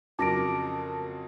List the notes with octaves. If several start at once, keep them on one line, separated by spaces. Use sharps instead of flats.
F2 C#3 F#3 A#4 A5 D6 A#6 D7